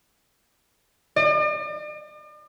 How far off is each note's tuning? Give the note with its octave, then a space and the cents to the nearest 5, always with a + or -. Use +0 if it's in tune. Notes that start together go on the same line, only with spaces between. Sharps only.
D5 +45